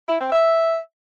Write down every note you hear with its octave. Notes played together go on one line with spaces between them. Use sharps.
E4
C4
E5